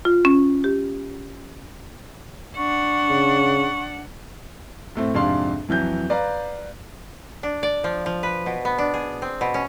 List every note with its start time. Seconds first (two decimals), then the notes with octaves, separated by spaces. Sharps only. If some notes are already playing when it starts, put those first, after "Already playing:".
0.05 F4
0.25 C#4
0.64 G4
2.56 D4 F#5 C#6
3.09 C#3
4.96 A2 A3 C4
5.14 F2 G#2 C3 D4 F5 C6
5.68 F2 E3 F#3 G6
6.10 B4 D5 F5 A#5
7.43 D4
7.63 D5
7.84 F3
8.06 F3
8.23 B4
8.46 B2
8.65 B3
8.78 D4
8.94 G#4
9.22 C4
9.41 B2
9.54 C#4